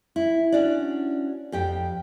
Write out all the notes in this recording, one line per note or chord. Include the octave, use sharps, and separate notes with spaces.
E4
C#4 D4 F#4 D5
F2 G4 G5